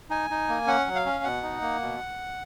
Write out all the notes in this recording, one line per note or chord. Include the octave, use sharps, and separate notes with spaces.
D#4 G#5
D#4
A#3
C#4 F#5
F#3
F5
C#4
B2 F#5
D#4
A#3
B2